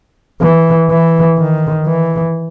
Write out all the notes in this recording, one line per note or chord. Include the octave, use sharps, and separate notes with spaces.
E3
E3
D#3
E3